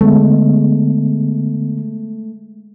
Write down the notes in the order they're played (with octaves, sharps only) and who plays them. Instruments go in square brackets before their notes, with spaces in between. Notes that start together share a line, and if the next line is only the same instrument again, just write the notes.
[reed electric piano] D3 B3 [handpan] G#3 [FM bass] A3